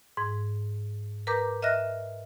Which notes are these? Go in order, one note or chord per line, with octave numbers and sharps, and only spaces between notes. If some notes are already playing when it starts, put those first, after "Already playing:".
G#2 G#6
A#4 B4 A#5 D6 G6
D#5 E5 F6 F#6 A#6